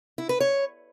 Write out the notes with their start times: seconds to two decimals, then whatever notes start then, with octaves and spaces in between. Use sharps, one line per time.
0.18 E4
0.29 B4
0.40 C#5